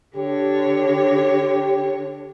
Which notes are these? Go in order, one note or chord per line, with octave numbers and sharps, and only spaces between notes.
D3 G4 C#5